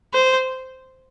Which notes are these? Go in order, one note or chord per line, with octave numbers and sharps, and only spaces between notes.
C5